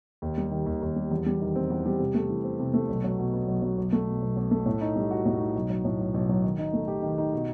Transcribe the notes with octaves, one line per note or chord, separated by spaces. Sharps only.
D#2
G3
D#3
D#2
D#2
G3
E2
G3
D#3
C4
E2
G3
C3
A3
E3
C4
C3
A3
B1
F#3
B2
B3
B1
F#3
B1
A3
B2
B1
B1
A3
A2
D#4
G3
F#4
A2
D#4
B1
F#3
A2
B1
B1
F#3
D#3
D#4
A3
G4
D#3
D#4
B2